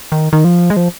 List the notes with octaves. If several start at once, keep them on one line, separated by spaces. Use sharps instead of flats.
D#3
D#3
F3
G#3
F3